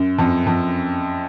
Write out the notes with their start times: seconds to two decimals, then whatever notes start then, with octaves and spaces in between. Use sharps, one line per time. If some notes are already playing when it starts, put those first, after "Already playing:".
Already playing: F#2
0.18 F2
0.47 F2